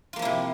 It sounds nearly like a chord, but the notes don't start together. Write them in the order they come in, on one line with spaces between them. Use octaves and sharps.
F4 A#3 F3 E4 C3